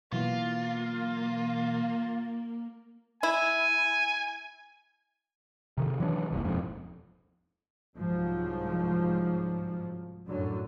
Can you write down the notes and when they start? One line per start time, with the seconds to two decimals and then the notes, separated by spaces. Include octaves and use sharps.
0.13 B2 E3 F#3 A#3 F4
3.23 E4 G#5
5.78 C3 D#3
6.00 E3 F#3 C#4 D4
6.31 F#1 C2
6.44 E1 F2 G#2
7.96 C2 G#2 F3 F#3
10.26 F#2 A2 D3 F#3